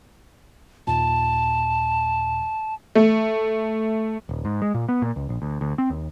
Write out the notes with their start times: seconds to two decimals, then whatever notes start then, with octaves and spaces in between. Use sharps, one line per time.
0.87 D#2 A#2 A5
2.95 A3
4.29 D#1
4.45 G#2
4.62 G#3
4.74 A#2
4.89 B3
5.02 A#2
5.16 C#2
5.29 A#1
5.42 D2
5.61 D2
5.78 C4
5.90 D#2